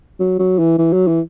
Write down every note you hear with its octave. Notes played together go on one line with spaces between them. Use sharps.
F#3
F#3
E3
E3
F#3
E3